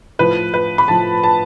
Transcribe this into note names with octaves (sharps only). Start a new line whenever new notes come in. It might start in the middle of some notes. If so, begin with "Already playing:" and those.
A2 F3 B4
B4
B5
A2 F3 A5
A5